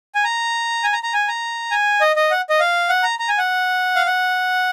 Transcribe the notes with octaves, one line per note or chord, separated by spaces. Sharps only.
G#5
A#5
G#5
A#5
A#5
G#5
A#5
G#5
D#5
D#5
F#5
D#5
F5
F#5
A#5
A#5
G#5
F#5
F5
F#5